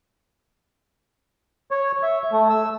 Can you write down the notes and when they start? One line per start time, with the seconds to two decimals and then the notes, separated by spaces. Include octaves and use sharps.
1.71 C#5
2.03 E5
2.32 A3
2.50 E6